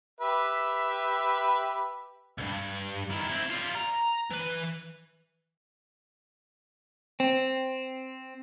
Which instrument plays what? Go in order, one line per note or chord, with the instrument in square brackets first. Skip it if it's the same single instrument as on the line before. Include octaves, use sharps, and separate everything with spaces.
[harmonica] G4 B4 E5
[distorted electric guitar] C2 G2
D#3 E3
C4 E4
G3 F4
A#5
E3 B4
[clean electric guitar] C4